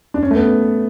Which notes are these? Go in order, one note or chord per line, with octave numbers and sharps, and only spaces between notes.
D4
C#4
A3
B3